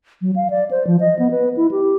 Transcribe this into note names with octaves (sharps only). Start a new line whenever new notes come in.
F#3
F5
D5
C5
F3
D#5
B3
B4
E4
G4